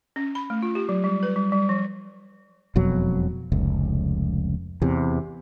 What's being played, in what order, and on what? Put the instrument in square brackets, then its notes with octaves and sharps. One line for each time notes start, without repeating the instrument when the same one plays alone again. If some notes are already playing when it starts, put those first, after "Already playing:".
[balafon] C#4
B5
A3
F4
G4
F#3
G3
B4
G3
G3
F3
[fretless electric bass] E1 F2 B2 F#3
F1 C#2
E2 C3